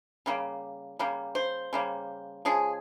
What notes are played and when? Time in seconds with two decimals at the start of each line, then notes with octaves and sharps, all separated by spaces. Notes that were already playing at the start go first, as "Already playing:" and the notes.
0.26 C#3 G3 A#3
0.99 C#3 G3 A#3
1.35 C5
1.73 C#3 G3 A#3
2.45 C#3 F3 G#3 G#4